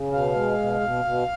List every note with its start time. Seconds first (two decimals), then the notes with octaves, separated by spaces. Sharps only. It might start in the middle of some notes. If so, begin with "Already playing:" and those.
Already playing: C#3
0.12 B2 F5
0.35 G#3
0.58 B2
0.80 B2
1.05 B2